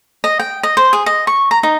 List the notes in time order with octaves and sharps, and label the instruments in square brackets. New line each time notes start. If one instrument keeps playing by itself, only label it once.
[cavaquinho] D#5
G5
D#5
C5
G#4
D#5
C#6
A#5
D#4